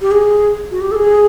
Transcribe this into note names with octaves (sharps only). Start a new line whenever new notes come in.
G4
G#4
F#4
G4
A4
G#4